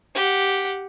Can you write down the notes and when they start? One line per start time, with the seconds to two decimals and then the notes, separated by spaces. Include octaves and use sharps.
0.15 G4 F#5